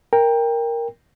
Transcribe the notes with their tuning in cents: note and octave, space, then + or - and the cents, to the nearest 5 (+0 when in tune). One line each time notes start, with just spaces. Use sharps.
A#4 +0 G5 +20